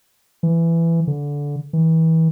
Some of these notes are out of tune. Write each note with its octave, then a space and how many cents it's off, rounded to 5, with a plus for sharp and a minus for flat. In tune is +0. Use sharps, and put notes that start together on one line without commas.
E3 +15
D3 -20
E3 -30